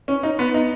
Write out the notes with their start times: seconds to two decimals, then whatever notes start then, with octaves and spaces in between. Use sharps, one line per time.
0.08 C#4
0.23 D#4
0.39 B3
0.54 D#4